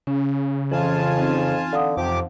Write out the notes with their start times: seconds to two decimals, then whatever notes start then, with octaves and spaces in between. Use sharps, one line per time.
0.07 C#3 C#4
0.72 F2 E3 F4 G#5 A5
1.16 C4 D#4
1.73 D3 F5 F#5 D#6
1.97 F2 C3 F3 G4 D6